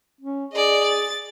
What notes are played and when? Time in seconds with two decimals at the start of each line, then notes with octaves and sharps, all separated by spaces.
0.21 C#4
0.53 G#4 D5 D#5
0.84 A6